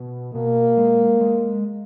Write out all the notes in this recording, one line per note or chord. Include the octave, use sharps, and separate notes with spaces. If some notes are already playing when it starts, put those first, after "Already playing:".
Already playing: B2
B2 A#3
G#3
G#3